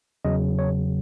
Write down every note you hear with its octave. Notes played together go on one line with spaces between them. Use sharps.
E2 C#3 F#3 D#5
C#5